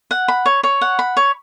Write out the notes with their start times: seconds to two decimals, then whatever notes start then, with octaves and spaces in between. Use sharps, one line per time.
0.11 F#5
0.28 B5
0.46 C#5
0.63 C#5
0.81 F#5
0.99 B5
1.17 C#5